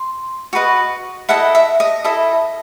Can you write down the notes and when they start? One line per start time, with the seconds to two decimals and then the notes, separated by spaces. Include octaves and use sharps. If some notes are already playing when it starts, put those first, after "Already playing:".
Already playing: C6
0.53 F#4 B4 D#5
1.29 E4 A4 D#5 F#5
1.55 E5
1.80 D#5
2.05 E4 A4 D#5